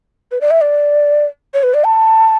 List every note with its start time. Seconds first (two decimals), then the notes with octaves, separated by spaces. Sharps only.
0.31 B4
0.41 D5
0.51 E5
0.61 D5
1.54 C#5
1.63 B4
1.74 D5
1.84 A5